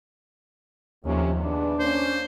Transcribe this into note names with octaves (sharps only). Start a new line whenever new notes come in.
D#2 A2 C3 F3 C#4
E2 D4
A#3 C#4 C5